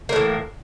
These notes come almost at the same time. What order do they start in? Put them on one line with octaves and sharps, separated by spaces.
A#3 A2 E3